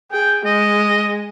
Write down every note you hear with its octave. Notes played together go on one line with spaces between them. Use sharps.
G#4 G5
G#3 D#5